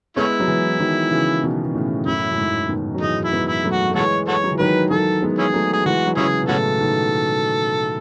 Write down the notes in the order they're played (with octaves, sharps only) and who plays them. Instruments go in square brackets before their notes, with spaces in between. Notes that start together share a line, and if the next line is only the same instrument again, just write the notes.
[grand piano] G#3 B3 [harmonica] A3 C#4 E4
[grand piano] F#3
E3 G#3
D#3 F#3
C#3 E3
B2 D#3
B2
A2 C#3
[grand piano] F#2 A2 [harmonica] E4
[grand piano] F#2
G#2
B2 D#3
F#3
[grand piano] E3 G#3 [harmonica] D#4
[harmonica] E4
[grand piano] G#3 B3
[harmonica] E4
[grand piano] F#3 A3
[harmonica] F#4
[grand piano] A3
[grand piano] E3 G#3 [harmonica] F#4 A4 C#5
[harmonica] F#4 A4 C#5
[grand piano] F#3
E3
[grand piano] D#3 F#3 [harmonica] B4
[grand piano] D#3 F#3 [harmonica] A4
[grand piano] G#3 B3
[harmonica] C#4 E4 G#4
[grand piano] F#3 A3
[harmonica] G#4
[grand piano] E3 G#3 [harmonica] F#4
[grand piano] F#3
[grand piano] C#3 E3 [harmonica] C#4 E4 G#4
[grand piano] B2
[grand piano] A2 C#3 [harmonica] C#4 F#4 A4
[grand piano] B2 D#3